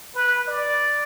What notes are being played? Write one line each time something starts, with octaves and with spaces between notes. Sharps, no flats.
B4
D5